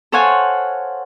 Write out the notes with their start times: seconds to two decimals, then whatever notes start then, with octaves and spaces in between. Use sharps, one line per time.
0.12 A4 C5 C#5 F5 F#5 G#5